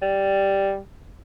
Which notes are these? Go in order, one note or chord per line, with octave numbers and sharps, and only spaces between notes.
G3